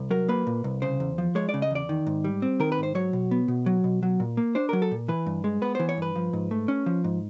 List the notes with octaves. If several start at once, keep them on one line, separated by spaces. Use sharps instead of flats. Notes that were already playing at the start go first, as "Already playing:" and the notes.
Already playing: C2
F#3 A#4
A#3 B4
A#2
C2
C#3 C5
E2
F3
G#3 C#5
D5
C#3
D#5
E2 D5
D#3
G#2
G3
C4
D#3 A#4
B4
G#2 C5
F#3 C#5
B2
B3
B2
F#3
B2
F#3
A#2
A#3
D4 C5
F#3 A#4
A4
A#2
E3 B4
G2
G#3
B3 B4
E3 C5
C#5
G2 B4
F3
G#2
A3
C#4
F3
G#2